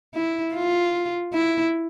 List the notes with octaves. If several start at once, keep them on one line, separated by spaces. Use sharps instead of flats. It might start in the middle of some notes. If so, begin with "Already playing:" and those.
E4
F4
E4